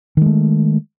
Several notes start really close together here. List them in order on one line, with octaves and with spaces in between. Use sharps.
D#3 G#3 A3